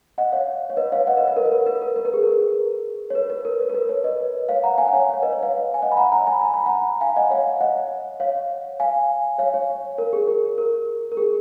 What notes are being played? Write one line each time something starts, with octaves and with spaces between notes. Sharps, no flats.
D#5 F#5
C#5 F5
C#5
B4 D#5
C#5 F5
D#5 F#5
B4 D#5
B4
A#4
B4
A#4
B4
A#4
B4
A#4
G#4
A#4
C#5
B4
B4
A#4
B4
A#4
B4
C#5
B4 D#5
C#5 F5
F#5 A#5
F5 G#5
F#5
C#5 F5
C#5
B4 D#5
C#5
C#5 F5
G#5
D#5 F#5
B5
F#5 A#5
F#5 A#5
G#5 B5
A#5
B5
F#5 A#5
F5 G#5
D#5 F#5
C#5 F5
D#5 F#5
C#5 F5
F5 G#5
C#5 F5
C#5
A#4
G#4
A#4
A#4
A#4
G#4